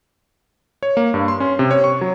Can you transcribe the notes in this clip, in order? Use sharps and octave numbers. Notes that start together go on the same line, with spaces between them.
C#5
A#3
G2
C6
C#4
C3
C#5
C#6
F#3